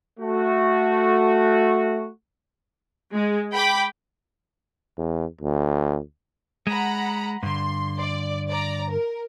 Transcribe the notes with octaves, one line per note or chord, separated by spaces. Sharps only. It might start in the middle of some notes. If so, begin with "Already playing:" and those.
A3 F#4
G#3
G5 B5 D6
E2
D2
G#3 F#5 A#5 B5
G2 D3 C6
D5
D5 A#5
A#4